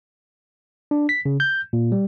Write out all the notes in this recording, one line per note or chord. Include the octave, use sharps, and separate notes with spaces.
D4
B6
C#3
G6
A#2
G3